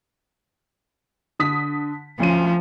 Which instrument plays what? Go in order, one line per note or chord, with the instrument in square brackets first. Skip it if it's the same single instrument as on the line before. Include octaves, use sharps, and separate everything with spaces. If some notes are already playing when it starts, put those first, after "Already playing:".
[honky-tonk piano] D3 D#6 B6
[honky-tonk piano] D2 C#4 D#7 [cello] F3